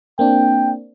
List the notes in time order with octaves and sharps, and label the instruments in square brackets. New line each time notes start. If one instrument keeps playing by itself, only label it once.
[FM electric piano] A#3 C4 D4 [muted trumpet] G5